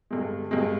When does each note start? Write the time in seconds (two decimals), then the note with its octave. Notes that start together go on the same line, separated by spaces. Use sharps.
0.11 G2 D3 G#3
0.51 G2 D3 G#3